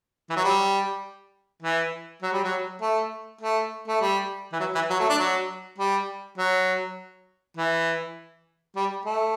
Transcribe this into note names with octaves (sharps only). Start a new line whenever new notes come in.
E3
F#3
G3
E3
F#3
G3
F#3
A3
A3
A3
G3
E3
F#3
E3
F#3
A3
D4
F#3
G3
F#3
E3
G3
A3